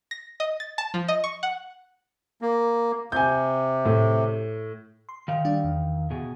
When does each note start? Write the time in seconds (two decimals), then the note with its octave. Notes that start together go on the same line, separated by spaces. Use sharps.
0.11 A#6
0.40 D#5
0.60 A6
0.78 A5
0.94 F3
1.08 D#5
1.24 C#6
1.43 F#5
2.42 A#3
3.12 C3 G#5 G6
3.85 A2
5.09 C6
5.28 D#3 F5
5.45 G3 D4 G4
5.64 E2
6.11 B2 G#4